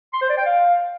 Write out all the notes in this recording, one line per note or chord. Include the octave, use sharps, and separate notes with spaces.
C6
C5
D5
G5
F5